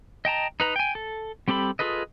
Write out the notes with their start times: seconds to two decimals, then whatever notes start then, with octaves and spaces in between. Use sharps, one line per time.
0.25 D#5 G5 A5 A#5
0.60 D#4 B4 A#5
0.76 G5 G#5
0.95 A4
1.48 G3 C4 G4 A4 B5
1.79 F4 G#4 A4 B4 D#5